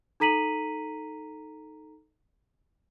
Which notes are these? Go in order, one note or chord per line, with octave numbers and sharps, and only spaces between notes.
D#4 A4 A#5 B6 D#7 F#7